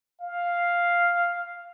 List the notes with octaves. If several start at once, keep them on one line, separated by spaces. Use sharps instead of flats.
F5